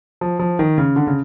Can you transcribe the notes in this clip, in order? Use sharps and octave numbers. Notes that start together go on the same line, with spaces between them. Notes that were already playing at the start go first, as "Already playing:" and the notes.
F3
F3
D#3
C#3
D3
C#3